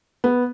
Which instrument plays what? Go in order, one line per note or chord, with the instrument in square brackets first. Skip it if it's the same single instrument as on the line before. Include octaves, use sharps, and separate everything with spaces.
[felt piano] B3